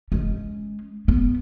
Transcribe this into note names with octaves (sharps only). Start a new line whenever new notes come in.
G#3 C#4
B3